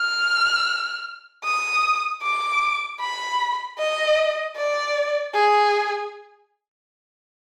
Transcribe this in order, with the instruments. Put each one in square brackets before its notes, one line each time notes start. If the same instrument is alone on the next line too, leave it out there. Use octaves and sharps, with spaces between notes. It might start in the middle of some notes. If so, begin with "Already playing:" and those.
Already playing: [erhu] F6
D#6
D6
B5
D#5
D5
G#4